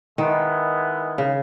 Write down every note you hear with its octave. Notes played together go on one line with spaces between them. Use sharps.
D#3 G#3 B3 E4
C#3